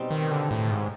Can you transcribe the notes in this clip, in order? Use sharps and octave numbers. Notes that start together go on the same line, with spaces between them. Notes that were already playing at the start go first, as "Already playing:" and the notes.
Already playing: B2 G3 C4 D#4
D#3
D3
A2
G#2